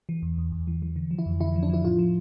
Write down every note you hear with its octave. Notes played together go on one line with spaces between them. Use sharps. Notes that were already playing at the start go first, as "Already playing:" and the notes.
E3
E2
E2
E2
E3
E3
D3
F3
E4
F2
D3 E4
F3
D4
F3 E4
A2 F4
F3